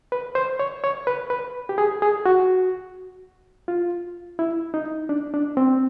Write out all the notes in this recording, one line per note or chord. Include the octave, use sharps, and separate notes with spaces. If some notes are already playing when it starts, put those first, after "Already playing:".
B4
C5
C#5
C#5
B4
B4
G4
G#4
G#4
F#4
F4
E4
D#4
D4
D4
C4